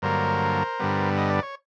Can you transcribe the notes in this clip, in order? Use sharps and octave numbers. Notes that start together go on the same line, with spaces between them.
G2 D3 F#3 A#3 A#4 C5
G2 D3 G3 B3
D#5
D5
C#5